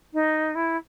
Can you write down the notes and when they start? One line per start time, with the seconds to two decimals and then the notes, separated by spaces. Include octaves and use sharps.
0.13 D#4
0.55 E4